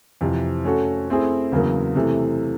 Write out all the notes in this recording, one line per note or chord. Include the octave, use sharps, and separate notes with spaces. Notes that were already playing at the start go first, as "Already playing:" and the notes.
F2 C3 E3
A3 C#4 F#4 A4
A3 C4 E4 G#4
E2 C#3 F#3 A#3
C3 E3 A3